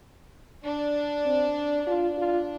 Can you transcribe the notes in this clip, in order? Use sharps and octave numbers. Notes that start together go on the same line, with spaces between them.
D4
C4
D4 F4
F4